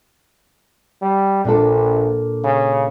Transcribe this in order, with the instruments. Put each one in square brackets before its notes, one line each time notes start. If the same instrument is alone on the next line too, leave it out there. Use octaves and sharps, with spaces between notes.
[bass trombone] G3
[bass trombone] A#1 [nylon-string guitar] A#2 D4 A4
[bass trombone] C#3